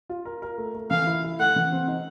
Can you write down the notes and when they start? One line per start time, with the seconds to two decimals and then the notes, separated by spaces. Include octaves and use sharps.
0.09 F4
0.25 A#4
0.42 A#4
0.58 A3
0.75 A3
0.90 E3 F5
1.07 E4
1.24 E4
1.39 A3 F#5
1.56 E3
1.72 C4
1.88 D#4